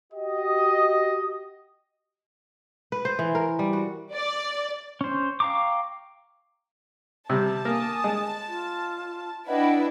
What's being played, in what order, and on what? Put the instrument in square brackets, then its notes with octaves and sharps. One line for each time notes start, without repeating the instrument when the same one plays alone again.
[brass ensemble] F#4 G4 D#5
[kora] B4
C5
E3
A#4
G3
F#4
[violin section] D5
[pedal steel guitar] C#4 C5
F5 G5 A#5 C#6 D6
[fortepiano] C3 G3 [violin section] A5
[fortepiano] A#3 [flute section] G#5 D#6
[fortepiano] G#3
[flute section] F4
[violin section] D4 E4 B4 [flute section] D#5 F#5 G5